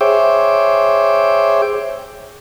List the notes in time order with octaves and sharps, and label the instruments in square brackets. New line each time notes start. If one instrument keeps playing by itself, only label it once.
[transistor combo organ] G#4 C5 C#5 E5 G5 D6